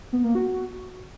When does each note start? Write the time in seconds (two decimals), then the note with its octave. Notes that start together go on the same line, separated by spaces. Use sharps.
0.13 B3
0.24 A#3
0.35 F#4